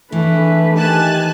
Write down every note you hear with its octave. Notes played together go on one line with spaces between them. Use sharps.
E3 A3 D4 B4
D#3 G4 G#5 A5 F#6